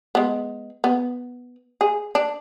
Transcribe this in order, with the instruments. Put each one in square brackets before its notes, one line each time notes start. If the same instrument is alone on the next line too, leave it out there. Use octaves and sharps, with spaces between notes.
[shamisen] G#3 B3
B3
G#4
D4